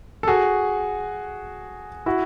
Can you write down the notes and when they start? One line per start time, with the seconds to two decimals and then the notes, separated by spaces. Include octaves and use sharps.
0.23 A4
0.28 F#4 G#4
2.06 E4 F#4